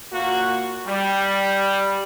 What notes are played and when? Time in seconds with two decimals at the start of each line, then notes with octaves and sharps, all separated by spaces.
0.12 A#2 A#3 F#4
0.87 G3